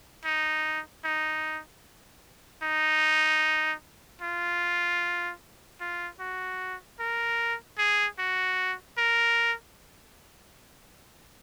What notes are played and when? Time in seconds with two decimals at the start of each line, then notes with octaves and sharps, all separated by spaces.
0.25 D#4
1.04 D#4
2.63 D#4
4.21 F4
5.80 F4
6.20 F#4
6.99 A#4
7.78 G#4
8.19 F#4
8.98 A#4